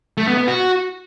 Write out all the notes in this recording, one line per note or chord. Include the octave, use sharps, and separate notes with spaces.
A3
B3
B3
F#4